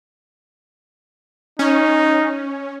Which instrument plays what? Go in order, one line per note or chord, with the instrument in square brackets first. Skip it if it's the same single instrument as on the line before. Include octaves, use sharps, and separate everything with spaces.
[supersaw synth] C#4 [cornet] D#4